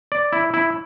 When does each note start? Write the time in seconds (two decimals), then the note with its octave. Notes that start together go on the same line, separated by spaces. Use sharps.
0.12 D5
0.33 E4
0.54 E4